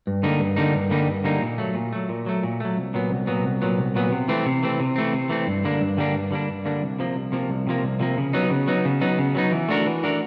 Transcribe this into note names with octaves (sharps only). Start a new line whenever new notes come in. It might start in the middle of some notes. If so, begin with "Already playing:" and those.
G2
D3 G3 A#3 D#4
G2
D3 G3 A#3 D#4
G2
D3 G3 A#3 D#4
G2
D3 G3 A#3 D#4
A#2
F#3 A3
A#2
F#3 A3
A#2
F#3 A3
A#2
F#3 A3
C2
A#2 F#3 B3
C2
A#2 F#3 B3
C2
A#2 F#3 B3
C2
A#2 F#3 B3
C3
E3 A3 C4
C3
E3 A3 C4
C3
E3 A3 C4
C3
E3 A3 C4
G2
D3 G3 A#3 D4
G2
D3 G3 A#3 D4
G2
D3 G3 A#3 D4
G2
D3 G3 A#3 D4
C2
C3 F3 A#3
C2
C3 F3 A#3
C2
C3 F3 A#3
C2
C3 F3 A#3
C#3
F#3 B3 D#4
C#3
F#3 B3 D#4
C#3
F#3 B3 D#4
C#3
F#3 B3 D#4
E3
A3 D4 F#4 A#4
E3
A3 D4 F#4 A#4